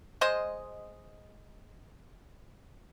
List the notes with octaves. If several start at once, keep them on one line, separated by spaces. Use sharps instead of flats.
G#3 C5 D#5